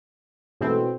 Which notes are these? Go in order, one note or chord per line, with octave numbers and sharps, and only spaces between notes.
G#2 B2 E3 A3 C4